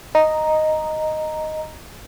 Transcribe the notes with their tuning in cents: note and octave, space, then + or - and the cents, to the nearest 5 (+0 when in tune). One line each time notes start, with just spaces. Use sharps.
D#5 +0 A#5 +0